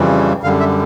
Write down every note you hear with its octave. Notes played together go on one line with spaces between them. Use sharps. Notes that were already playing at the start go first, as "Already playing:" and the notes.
Already playing: F2 C#3 E3 G3
F#2 D3 G3 F5
E5